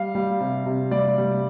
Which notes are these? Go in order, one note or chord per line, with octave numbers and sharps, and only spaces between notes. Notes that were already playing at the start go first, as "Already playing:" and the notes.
Already playing: G3 F5
G3
C3
C3
G3 D5
G3